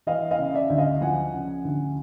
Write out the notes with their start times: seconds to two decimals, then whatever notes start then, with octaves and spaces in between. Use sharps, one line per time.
0.07 E3 D#5 F5
0.31 D#5 F5
0.39 C#3
0.54 D5 E5
0.70 D2
0.78 D#5 F5
1.01 F3 F#5 G#5
1.33 C#3
1.65 D2